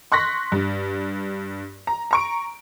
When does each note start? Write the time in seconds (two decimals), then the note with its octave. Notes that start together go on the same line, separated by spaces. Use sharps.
0.12 C6 C#6 F#6 A#6 B6
0.52 G2
1.87 A#5
2.11 A#5 C#6 D7